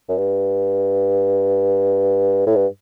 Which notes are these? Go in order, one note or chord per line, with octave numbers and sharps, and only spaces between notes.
F#2
G2
A2
G2